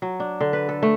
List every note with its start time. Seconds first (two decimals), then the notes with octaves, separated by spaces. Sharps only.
0.02 F#3
0.20 D4
0.41 D3
0.53 B4
0.69 A4
0.83 A3